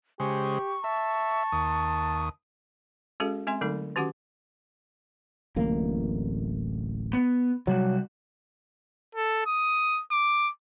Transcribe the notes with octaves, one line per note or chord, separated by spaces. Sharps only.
C#3 G#3 G4 C5 C#6
E5 A5
D#2 D#6
G#3 C#4 F#4 G#4 A4 F5
G#3 C4 E5 G#5 C6
D3 F#3 A3 D#4 A4
D#3 C#4 F#4 G4 F#5 D6
D1 A1 A#3
B3
C3 F#3 G3 F#4
A4
D#6
D6